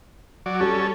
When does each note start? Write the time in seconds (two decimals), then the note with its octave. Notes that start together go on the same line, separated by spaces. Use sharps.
0.46 F#3 D5
0.60 G3 C#4 A4